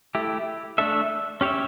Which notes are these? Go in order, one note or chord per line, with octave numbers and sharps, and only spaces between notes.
A3 E4 G4
A3 D4 A4 E5
C#4 G4 C#5 E5